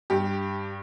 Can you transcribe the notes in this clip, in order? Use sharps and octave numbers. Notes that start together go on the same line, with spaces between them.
G2 G4